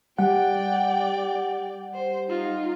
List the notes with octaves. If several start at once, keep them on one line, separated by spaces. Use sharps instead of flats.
G3 G4 D5 F#5 G5
C5
D#4 F4